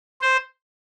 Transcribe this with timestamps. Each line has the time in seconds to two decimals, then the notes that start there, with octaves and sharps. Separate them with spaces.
0.22 C5